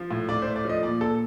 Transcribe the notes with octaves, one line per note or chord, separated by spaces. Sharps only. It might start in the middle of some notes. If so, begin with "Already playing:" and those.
Already playing: F3
A2
A2 D5
C5
A3
D5
F3 D#5
A#2 D5
A#2 A4